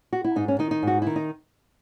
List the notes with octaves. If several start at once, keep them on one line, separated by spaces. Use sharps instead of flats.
F#4
E4
G#2 D#4
C#4
D#3 D#4
D#4
G#2 F#4
D#3 E4
D#4